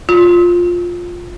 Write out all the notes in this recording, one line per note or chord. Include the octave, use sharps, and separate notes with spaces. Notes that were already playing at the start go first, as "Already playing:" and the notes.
F4